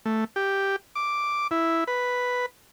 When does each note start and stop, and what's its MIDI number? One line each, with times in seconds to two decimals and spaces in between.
0.05 0.24 57
0.36 0.76 67
0.95 1.47 86
1.51 1.84 64
1.87 2.46 71